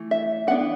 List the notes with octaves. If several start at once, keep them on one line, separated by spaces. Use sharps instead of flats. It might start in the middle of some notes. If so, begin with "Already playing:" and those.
Already playing: E3 A3
E5
E3 B3 D4 F#5